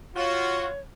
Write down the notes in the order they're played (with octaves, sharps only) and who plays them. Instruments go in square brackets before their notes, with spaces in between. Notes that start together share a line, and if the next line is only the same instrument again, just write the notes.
[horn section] F4 F#4 [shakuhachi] C#5